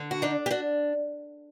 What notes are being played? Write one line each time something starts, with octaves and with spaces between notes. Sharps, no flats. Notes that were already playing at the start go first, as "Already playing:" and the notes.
Already playing: D3
F#4
D4 D#4
G4
D4 F#4